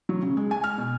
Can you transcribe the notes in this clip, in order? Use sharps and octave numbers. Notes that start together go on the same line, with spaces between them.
F#3
C#3
G#3
G#5
F6
B2